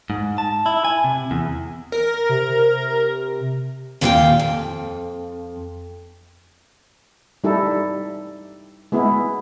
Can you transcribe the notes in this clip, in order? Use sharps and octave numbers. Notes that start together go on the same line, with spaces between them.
G#2
A5
E4
G#5
C3
E2
A#4
C3
D#2 A#2 C#4 G#4 F5 G5
F2
G3 D#4 E4 A4
G#3 B3 E4